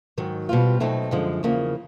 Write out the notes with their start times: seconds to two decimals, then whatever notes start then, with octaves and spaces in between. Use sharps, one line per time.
0.17 G#2 D#3 F#3
0.49 B2 G3 C4 F4
0.80 B2 F#3 A3 C4 D#4
1.11 F#2 D3 F3 G#3
1.43 E2 C#3 F3 A#3